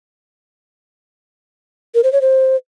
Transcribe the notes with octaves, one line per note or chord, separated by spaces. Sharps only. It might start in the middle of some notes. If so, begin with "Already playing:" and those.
A#4
C5
C#5
C5